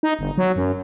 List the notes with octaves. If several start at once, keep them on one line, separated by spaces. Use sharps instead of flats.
D#4
G1
F#3
F#2